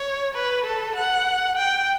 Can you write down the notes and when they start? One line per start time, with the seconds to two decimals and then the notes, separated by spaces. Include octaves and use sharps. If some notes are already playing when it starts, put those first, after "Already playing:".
Already playing: C#5
0.34 B4
0.64 A4
0.95 F#5
1.57 G5